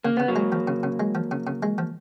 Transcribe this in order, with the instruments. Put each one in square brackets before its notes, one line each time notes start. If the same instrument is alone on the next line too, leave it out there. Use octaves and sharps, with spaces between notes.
[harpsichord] C#3 [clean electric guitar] A#3
[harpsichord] C#3 [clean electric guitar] B3
[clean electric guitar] F#3 A#3
[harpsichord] G#3
F3
C#3
C#3
G#3
F3
C#3
C#3
G#3
F3